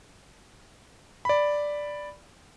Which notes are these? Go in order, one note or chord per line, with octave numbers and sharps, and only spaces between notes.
D5 B5